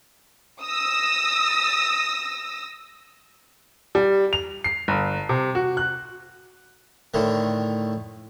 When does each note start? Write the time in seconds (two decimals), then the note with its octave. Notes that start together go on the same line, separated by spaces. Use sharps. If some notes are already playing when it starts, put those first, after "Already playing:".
0.62 D#6 E6 A#6
3.95 G3
4.33 F7
4.64 C7
4.88 G1
5.29 C3
5.55 F#4
5.77 F#6
7.14 A2 D3 D#3